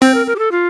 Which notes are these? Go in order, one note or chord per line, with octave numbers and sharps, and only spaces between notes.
C4 C5
A#4
A#4
G4
A4
F4